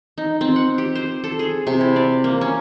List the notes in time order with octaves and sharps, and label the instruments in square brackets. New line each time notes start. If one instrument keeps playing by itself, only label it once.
[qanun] D#4
C4
F#5
G4
C5
A4
G#4
C3
E4
D5
A#3
C#4